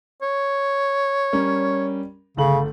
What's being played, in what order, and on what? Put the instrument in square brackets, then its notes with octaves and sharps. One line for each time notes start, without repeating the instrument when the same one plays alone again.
[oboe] C#5
[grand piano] G3 C#4 A#4
[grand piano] G1 A3 F#7 [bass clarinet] C#3